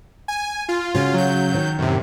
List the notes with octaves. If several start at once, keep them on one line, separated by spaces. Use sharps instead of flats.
G#5
F4
C#3 F4 F#4
F#3 G6
D#3
F#2 A2 C3